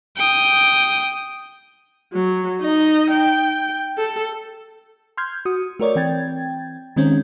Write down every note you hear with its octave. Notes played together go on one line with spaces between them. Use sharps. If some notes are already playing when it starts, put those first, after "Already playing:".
G5 D#6
F#3
D#4 D#5
G5
A4
C6 F6 G6 G#6
F#4 D#6
A3 F#4 A#4 C#5 D5
E3 C4 G5 G#6 A6
D#3 G#3 C4 C#4